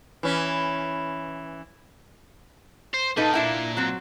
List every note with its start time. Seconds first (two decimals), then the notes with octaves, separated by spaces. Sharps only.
0.23 E3 C#4
2.94 C5
3.17 A#2 A#3 D#4 A4 B4
3.34 D4 E4 G5
3.77 F#3 C4